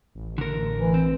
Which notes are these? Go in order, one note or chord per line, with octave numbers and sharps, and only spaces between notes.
A1
D3 A#4
E3
C4